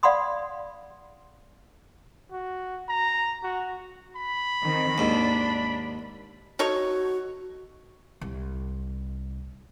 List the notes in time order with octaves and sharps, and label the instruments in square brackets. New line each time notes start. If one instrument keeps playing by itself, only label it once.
[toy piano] D5 F5 F#5 B5 C6 D#6
[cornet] F#4
A#5
F#4
[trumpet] B5
[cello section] D#3 C4
[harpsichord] D#2 G#2 [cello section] D4
[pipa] D#4 A4 C#5 [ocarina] F#4
[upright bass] C2